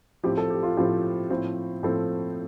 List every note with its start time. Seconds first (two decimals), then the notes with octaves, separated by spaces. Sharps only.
0.23 A2 F3 C4 G4
0.37 A4
0.50 G4
0.63 F4
0.77 A2 F3 C4 G4
1.30 A2 F3 C4
1.83 A2 F3 C4 A4